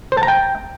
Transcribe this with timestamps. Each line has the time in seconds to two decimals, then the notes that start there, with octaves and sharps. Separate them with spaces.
0.12 C5
0.17 A5
0.23 A#5
0.28 G5